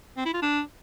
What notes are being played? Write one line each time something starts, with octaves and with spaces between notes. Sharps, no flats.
C4
E4
F4
D4